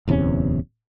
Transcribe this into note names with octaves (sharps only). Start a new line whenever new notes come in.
D1 E2 C3 C#4